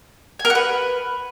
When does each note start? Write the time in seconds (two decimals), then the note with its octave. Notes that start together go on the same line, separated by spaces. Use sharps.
0.39 G#5
0.45 A#4
0.50 F#5
0.55 B4